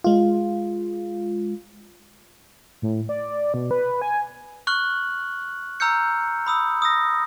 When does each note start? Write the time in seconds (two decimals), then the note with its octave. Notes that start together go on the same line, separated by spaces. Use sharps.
0.04 G#3 F4
2.82 A2
3.09 D5
3.54 B2
3.71 B4
4.02 G#5
4.67 C#6 F6 F#6 F#7
5.80 A#5 E6 F6 G6 C#7
6.46 B5 D#6 E6
6.82 D#6 E6 A#6